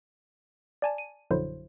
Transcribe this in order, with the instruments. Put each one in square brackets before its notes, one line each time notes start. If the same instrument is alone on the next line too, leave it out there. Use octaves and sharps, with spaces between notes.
[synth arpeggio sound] D5 G#5 A5
D#7
A#1 F#2 D3 F#3 E4 C5